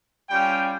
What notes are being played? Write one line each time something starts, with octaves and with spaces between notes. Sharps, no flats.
G3 C#4 F4 G5